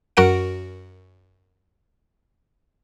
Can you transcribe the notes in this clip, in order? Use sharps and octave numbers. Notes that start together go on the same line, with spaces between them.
F#2 F#4 A#4 F#5 D7